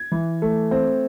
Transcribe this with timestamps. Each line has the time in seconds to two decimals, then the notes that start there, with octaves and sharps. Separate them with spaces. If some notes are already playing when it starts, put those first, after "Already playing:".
Already playing: G#6
0.12 E3
0.42 A3
0.71 C4